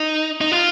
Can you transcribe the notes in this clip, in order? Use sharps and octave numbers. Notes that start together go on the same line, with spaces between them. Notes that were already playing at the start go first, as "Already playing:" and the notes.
Already playing: D#4
D#4
F4